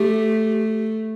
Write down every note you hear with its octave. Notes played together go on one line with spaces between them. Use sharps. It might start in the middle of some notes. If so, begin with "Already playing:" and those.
Already playing: A3 G4